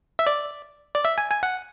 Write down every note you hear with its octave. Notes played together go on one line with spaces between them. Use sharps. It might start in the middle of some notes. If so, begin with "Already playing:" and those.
E5
D5
D5
E5
G#5
G#5
F#5